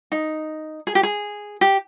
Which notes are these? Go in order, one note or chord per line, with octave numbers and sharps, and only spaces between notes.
D#4
G#4
G4
G#4
G4